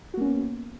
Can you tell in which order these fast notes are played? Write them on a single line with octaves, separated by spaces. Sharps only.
F#4 A#3 C#4 B3